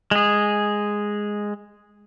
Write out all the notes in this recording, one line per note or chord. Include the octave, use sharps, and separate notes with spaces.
G#3 G#4